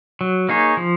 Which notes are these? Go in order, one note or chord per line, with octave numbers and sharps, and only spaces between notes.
F#3
A#3 D#4 G#4 C#5
F3